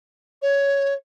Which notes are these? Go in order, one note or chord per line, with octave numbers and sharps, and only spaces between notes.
C#5